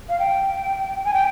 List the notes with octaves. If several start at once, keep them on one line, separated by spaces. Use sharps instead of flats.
F5
G5
G#5
G5